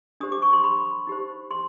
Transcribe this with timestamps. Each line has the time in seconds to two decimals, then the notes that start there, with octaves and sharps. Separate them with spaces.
0.20 D4 G4 C5 D#6
0.32 D6
0.42 C#6
0.53 C6
0.64 B5
1.07 D#4 G4 C5
1.51 C6